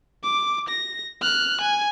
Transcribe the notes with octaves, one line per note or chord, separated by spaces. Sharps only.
D6
A#6
F6 F#6
G#5